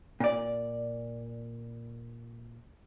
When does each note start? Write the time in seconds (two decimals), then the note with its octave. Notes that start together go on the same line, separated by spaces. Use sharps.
0.20 A#2 D5